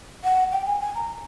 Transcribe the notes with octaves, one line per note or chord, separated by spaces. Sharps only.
F#5
G5
G#5
G#5
A#5